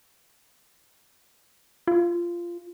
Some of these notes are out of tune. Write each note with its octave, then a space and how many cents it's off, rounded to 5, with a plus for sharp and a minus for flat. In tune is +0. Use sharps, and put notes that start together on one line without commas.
F4 -15